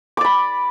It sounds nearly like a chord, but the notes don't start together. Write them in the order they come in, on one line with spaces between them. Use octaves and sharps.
D6 D5 B5